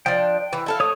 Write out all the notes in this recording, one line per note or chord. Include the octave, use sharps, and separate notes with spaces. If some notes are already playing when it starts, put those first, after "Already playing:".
F3 D4 G5
E3
E4 A4 F5
A3 C#5 D#6